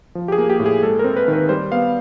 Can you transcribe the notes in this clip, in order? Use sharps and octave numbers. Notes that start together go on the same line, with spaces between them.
F3
G4
G#4
A#3
G4
A2
G#4
G#3 A4
C4 A#4
B4
D#3
B4
G3 C5
B3 F5